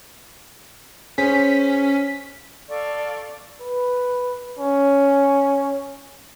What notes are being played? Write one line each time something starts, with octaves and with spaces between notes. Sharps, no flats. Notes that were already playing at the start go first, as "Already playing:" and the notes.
C#4 G#4 C5 C#5 B6
A4 D5 F5 C#6
B4
C#4